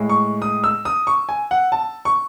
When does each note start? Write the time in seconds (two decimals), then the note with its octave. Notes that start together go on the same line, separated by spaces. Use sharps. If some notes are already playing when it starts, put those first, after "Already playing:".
Already playing: A2 G#3
0.09 C#6
0.42 D#6
0.64 E6
0.85 D#6
1.07 C#6
1.29 G#5
1.51 F#5
1.72 A5
2.05 C#6